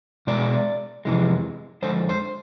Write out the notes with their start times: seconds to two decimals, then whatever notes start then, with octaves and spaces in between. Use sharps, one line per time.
0.27 B2 G#3 D5
1.05 F2 C3 E3 G#3
1.82 F2 D3 G#3 C5
2.09 C5